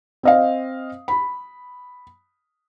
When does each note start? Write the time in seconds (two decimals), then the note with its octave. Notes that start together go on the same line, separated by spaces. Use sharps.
0.23 C4 D#5 F5
1.08 B5